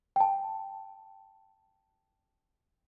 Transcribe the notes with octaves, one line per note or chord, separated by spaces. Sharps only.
G5 A5